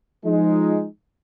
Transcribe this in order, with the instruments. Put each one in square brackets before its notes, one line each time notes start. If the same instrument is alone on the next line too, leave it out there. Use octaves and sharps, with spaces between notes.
[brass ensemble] F3 G#3 D#4